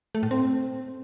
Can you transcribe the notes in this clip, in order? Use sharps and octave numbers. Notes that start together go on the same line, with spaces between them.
A3
A2
C4